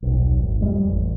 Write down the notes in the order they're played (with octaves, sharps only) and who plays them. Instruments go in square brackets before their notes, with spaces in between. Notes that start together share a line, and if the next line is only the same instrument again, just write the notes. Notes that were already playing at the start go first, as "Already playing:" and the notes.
[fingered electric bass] D#1 B1
D#1 G#1
F2 G3 G#3
A1